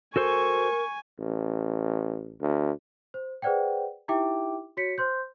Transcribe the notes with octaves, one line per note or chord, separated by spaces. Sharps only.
F#4 A4 A#4 C5 G#5 C#6
A1
D2
C5
G#4 B4 C5 D5 F#5 G5
D#4 E4 G4 E5 G5 D6
F#4 C#5 B6 C#7
C5 C6 G6